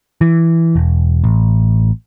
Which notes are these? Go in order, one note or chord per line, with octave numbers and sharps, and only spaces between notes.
E3
E1
A1